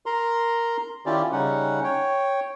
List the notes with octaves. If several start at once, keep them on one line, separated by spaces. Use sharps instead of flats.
A#4 A#5 C6
D#3 C#4 E4 F4 G4 D5
C#3 G3 C#4 D#4 F#5
C#5 G5